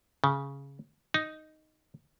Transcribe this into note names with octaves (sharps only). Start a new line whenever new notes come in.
C#3
D#4